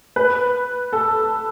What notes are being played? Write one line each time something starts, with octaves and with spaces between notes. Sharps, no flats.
B4
A4